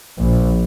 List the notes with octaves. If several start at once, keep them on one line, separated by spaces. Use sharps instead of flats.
A#1